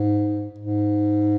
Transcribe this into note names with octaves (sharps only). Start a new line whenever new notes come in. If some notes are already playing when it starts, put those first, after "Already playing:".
Already playing: G#2
G#2